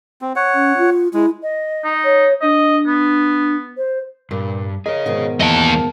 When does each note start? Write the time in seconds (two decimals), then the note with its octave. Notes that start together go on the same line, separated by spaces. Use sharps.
0.22 C4
0.36 C#5 F#5
0.54 C#4
0.78 F4
1.14 G#3 E4
1.42 D#5
1.84 D#4
2.04 C#5
2.41 D4 D#5
2.87 B3
3.77 C5
4.31 G2 A#2
4.86 G#4 A#4 C#5 D#5
5.06 G#2 B2 D#3
5.40 E2 A#3 A#4 D#5 F5 A5